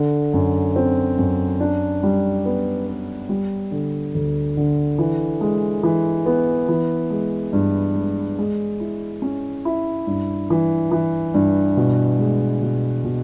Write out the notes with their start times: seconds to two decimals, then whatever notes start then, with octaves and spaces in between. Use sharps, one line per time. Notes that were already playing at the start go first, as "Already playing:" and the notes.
Already playing: D3
0.33 F#2
0.76 C4
1.18 F#2
1.60 D4
2.03 G3
2.45 B3
2.87 B3
3.29 G3
3.71 D3
4.15 D2
4.57 D3
4.98 E3
5.41 G#3
5.83 E3
6.26 B3
6.69 E3
7.10 G#3
7.53 G2
7.95 G#3
8.38 G#3
8.80 E4
9.22 C#4
9.65 E4
10.07 G2
10.50 E3
10.91 E3
11.34 G2
11.77 B2
12.19 G#3
12.62 B2
13.04 B2